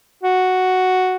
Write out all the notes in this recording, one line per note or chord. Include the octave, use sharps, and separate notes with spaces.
F#4